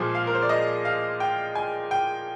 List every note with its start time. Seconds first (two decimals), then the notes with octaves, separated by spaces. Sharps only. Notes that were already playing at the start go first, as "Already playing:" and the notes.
Already playing: A#2 F3 G#3 G#4
0.15 F5
0.27 A#4
0.35 C5
0.42 D5
0.49 D#5
0.85 F5
1.20 G5
1.55 G#5
1.91 G5